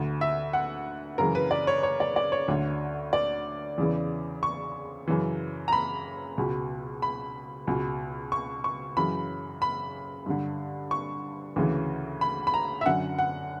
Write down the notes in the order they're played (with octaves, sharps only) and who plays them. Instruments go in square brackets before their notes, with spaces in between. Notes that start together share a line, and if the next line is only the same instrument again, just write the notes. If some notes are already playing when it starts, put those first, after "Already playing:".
Already playing: [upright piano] D2 D3
E5
F#5
F#2 C#3 E3 A#4
B4
D5
C#5
C#5
D5
D5
C#5
D2 D3
D5
E2 C#3 E3
C#6
F#2 C#3 E3
A#5
B5
C#2 B2
B5
C#2 B2
C#6
C#6
F#2 C#3 E3 B5
B5
G2 D3
C#6
D2 C#3 E3
B5
B5
A#5
E5
F#2 D3 F#5
F#5